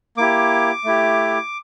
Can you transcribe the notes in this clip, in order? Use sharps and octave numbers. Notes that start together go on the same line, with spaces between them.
A#3 E4 G4 D6
A3 E4 G4